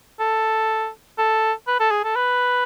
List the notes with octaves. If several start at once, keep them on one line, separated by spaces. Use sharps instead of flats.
A4
A4
B4
A4
G#4
A4
B4